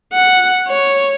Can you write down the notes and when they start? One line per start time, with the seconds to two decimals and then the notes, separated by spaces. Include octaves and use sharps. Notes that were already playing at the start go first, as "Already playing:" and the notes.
0.13 F#5
0.68 C#5